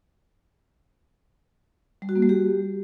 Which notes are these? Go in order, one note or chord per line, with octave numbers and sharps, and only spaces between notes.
G3
F#4
A#3
G3
G4